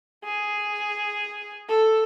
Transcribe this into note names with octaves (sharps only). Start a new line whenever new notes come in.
G#4
A4